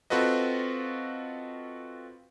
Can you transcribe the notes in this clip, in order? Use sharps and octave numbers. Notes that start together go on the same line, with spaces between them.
C4 F4 F#4 A4 B4 D#5